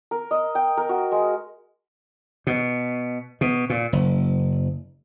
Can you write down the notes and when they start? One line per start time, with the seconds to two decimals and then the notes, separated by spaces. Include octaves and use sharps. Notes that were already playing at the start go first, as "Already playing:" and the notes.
0.11 A#4
0.31 D#5
0.55 G5
0.77 A#4
0.89 F#4
1.12 G#3
2.47 B2
3.41 B2
3.70 A#2
3.93 F#1